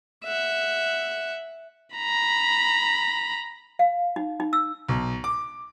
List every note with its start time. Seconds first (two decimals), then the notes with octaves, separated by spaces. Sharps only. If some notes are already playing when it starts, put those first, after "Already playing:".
0.24 E5 F#5
1.96 A#5 B5
3.79 F5
4.16 D#4
4.40 D#4
4.53 E6
4.89 B1
5.24 D6